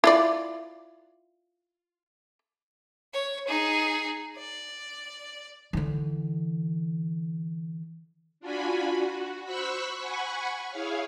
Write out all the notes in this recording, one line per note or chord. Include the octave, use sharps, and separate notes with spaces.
E4 F4 D5
C#5
D#4 G#4
D5
D3 E3
D4 F4 F#4 G#5 B5
F#4
C5 B5 C#6 E6 F#6 B6
F#5 G#5 B5 C#6
E4 G#4 C#5 F5